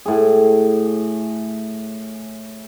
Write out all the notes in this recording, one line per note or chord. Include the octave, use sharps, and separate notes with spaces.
A2 G#4